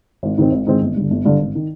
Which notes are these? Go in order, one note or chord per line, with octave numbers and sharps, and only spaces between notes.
G#1
G#2 D#3 G#3 C4
G#1
G#2 D#3 G#3 C4
G1
G2 D3
G1
G2 D3
G#1
D#3